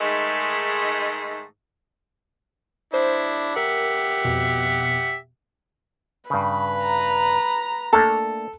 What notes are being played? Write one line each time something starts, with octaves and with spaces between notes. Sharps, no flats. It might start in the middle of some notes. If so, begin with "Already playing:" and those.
G#2 D#3 G#3 A3
D4 E4 C5
G4 A#4 E5 F#5
F2 B2
G2 C#3 B4
A#5
A3 A#3 D4 A4